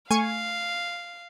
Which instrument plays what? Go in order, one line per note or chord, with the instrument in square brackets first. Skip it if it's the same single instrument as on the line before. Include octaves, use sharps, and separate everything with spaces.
[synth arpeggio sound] A3 [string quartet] F5 [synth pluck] G#5 C#6